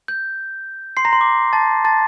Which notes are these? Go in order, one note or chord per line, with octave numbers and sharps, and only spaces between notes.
G6
C6 C7
A#5 A#6
C6
D6
A5 A6
A5 A6